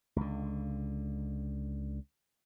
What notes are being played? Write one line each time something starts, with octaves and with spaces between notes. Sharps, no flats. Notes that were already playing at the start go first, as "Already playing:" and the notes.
C#2 D3